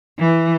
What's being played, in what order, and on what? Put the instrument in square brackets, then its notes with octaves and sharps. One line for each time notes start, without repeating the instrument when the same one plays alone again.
[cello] E3